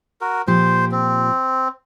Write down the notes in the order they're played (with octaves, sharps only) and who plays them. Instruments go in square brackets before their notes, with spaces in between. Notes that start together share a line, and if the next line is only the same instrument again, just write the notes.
[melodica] F#4 A#4
[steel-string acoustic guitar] A#2 F3 G4 [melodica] C5
[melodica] C4